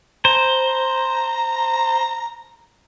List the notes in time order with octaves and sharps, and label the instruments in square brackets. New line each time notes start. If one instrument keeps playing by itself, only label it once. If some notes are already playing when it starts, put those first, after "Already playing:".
[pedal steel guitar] C5 [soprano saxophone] A#5